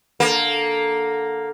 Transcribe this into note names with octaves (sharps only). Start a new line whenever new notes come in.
D3 A#3